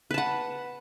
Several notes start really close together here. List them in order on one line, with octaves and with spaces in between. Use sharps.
B4 A5 F#5